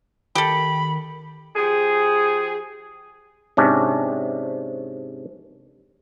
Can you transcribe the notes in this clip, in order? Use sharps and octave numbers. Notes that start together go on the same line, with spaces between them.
D#3 G4 A4 B5
F3 G4 G#4
G#2 C3 C#4 D4